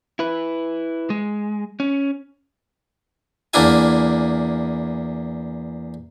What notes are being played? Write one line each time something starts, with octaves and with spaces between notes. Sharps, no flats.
E4 B4
G#3
C#4
E2 A#3 D4 E4 G#5